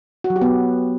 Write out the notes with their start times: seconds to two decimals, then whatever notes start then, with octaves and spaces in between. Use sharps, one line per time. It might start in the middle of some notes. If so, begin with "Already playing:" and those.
0.24 F#4
0.30 F#3
0.36 G4
0.41 B3